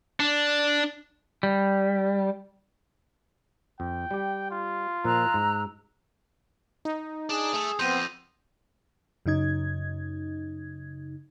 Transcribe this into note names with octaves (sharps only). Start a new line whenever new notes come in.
D4
G3
F2 G5
G3 G4
F4
A#2 F3 A#5 E6 F#6
G#2
D#4
D4 G#4
A3 A4
F2 B3 C4 C6 G6 D#7
F#2 C#3 D#4 G#6